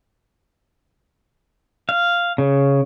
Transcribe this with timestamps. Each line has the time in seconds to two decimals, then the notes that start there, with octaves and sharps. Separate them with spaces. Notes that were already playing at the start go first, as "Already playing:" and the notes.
1.89 F5
2.38 C#3